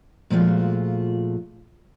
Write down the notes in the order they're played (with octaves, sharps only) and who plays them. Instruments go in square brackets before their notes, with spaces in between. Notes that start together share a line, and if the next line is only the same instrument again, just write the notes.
[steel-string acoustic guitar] A#2 F3 G#3 A3 F4 F#4